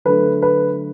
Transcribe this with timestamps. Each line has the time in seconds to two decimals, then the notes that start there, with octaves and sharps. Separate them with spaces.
0.05 D3 F#3 A3 B4
0.42 B4